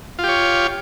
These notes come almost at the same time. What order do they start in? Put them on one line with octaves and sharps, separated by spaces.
F4 G4 C#5